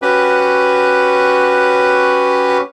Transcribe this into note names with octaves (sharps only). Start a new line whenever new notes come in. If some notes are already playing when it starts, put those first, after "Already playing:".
C#4 F#4 G4 B4